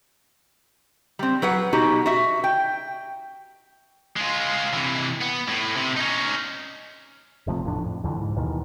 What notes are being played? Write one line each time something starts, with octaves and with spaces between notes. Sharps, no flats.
G3 C4
F#3 B4 F#5
B2 D#4 F#4 G4
F#4 E5
G5
G#3 F4
C3 E3
B3
A2
C3
C#4 D#4
F1 C3 F3 A3
E2 A2 F3 D4
F2
C2 F2 D3 E3
G#2
D#2 B2 D#3 E3